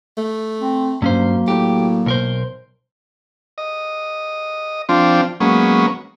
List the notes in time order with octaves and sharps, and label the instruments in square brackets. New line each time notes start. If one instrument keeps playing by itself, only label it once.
[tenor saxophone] A3
[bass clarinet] C4
[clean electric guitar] G2 C#4 C5 [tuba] F#3 [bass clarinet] A#3
[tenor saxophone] A2 [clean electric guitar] G4
[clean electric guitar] B1 A#4 C5
[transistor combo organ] D#5
F3 C4 D4 F4
F#3 G#3 A#3 B3 C#4